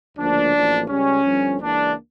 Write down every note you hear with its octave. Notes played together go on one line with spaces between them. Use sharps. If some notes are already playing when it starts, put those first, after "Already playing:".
D2 C#3 F3 A#3 D4
A1 A2 F3 A#3
C#2 C#3 G3 C#4
G1 G2 D3 F3
C#2 C#3 E3 A#3 D4